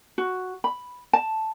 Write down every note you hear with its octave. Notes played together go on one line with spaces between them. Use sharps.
F#4
B5
A5